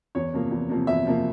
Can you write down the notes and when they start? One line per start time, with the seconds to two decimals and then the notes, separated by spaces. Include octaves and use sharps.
0.15 E2 C#5
0.33 C3 F3 A#3
0.51 E2
0.70 C3 F3 A#3
0.87 E2 E5
1.05 C3 F3 A#3